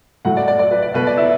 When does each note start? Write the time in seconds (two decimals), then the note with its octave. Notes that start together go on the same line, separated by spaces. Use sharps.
0.25 A2 F#3 A3 F#4 F#5
0.37 D5
0.48 D5
0.59 D5
0.71 B4
0.82 D5
0.94 B2 A3 B4
1.07 D5
1.17 E4 E5